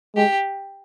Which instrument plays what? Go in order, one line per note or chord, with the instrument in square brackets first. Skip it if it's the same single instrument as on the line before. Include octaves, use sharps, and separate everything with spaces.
[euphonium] G#3 [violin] G4